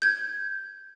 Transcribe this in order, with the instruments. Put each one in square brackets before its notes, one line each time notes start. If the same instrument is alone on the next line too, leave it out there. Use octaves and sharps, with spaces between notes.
[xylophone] G6 G#6